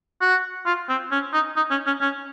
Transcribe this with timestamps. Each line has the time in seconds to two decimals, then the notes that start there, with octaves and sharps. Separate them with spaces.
0.21 F#4
0.66 F4
0.89 C4
1.11 C#4
1.33 D#4
1.56 D#4
1.71 C#4
1.86 C#4
2.01 C#4